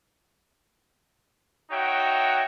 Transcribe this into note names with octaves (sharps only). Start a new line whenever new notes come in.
D#4 F#4 C#5 E5 F#5 G5